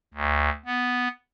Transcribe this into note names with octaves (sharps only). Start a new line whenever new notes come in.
D2
B3